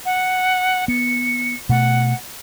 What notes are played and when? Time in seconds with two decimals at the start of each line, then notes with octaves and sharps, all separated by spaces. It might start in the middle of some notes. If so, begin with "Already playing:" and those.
0.05 F#5
0.88 B3 C#7
1.69 B2 A3 F#5